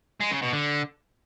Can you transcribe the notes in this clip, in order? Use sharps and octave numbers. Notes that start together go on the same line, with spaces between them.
G#3
C#3
B2
D3